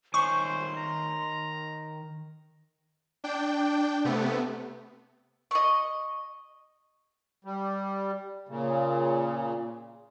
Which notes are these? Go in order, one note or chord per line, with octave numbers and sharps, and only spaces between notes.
D#3 C5 C#5 G#5 C6 C#6
A#5
D4 G5
C3 A3 B3
D#5 C#6
G3
A#2 C#3